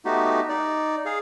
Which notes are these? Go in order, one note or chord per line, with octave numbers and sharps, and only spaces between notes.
A3 B3 D#4 F#4 G4
D#4 D5
G#4 F5